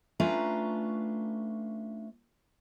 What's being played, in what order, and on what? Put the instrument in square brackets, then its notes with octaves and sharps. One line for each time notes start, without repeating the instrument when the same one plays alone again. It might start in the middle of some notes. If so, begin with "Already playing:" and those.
[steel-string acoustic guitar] A3 C#4 D4 F4 B4 A#5